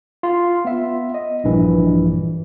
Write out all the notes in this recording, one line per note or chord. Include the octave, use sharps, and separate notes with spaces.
F4
B3 E5
D#5
A#1 G2 E3